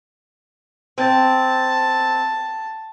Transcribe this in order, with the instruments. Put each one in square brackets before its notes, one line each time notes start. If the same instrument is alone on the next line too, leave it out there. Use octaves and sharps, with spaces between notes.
[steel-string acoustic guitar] C4 [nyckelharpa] A5